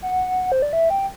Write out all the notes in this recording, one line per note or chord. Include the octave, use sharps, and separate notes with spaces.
F#5
C5
D5
E5
G5